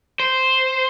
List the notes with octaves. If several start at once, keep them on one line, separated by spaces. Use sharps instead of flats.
C5